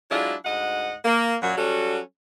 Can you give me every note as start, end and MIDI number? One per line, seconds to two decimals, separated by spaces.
0.11 0.35 54
0.11 0.35 56
0.11 0.35 62
0.11 0.35 64
0.11 0.35 65
0.45 0.94 38
0.45 0.94 44
0.45 0.94 75
0.45 0.94 78
1.05 1.37 58
1.43 1.56 42
1.43 1.56 46
1.43 1.56 54
1.58 2.00 54
1.58 2.00 55
1.58 2.00 61
1.58 2.00 66
1.58 2.00 69